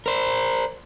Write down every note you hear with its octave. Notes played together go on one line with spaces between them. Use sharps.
A#4 C5